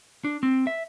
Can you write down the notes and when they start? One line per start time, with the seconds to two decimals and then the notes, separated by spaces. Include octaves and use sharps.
0.24 D4
0.43 C4
0.67 E5